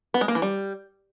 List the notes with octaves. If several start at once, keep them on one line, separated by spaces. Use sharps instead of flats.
B3
G#3
A#3
E3
G3